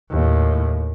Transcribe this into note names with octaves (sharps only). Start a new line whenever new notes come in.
D#2 A2